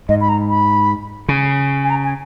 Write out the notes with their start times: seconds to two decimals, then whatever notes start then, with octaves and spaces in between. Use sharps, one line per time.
0.09 G#2 D#5
0.20 B5
0.29 A#5
0.49 B5
1.29 C#3
1.84 G#5
1.90 A#5
2.04 G#5